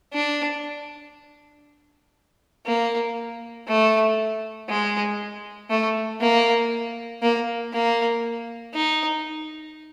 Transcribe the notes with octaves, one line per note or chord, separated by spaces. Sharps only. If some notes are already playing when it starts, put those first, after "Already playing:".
D4
A#3
A3
G#3
A3
A#3
A#3
A#3
D#4